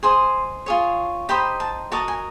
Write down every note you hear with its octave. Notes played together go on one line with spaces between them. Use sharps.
G#4 C5 D#5 C6
F4 G#4 C#5
D#4 G4 C5 D#5 B5
A5
F#4 A#4 D#5 A5
G#5